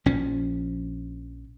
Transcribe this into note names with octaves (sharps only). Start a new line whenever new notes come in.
A#1 F3 C#4